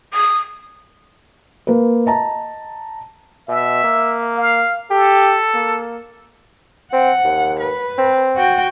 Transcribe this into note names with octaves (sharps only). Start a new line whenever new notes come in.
D#6
A#3 B4
D#5 A5 A#5
B2 E5
A#3
F5
G4 A4
A#3
C4 F#5
D#2
B4
C4
F#4 G5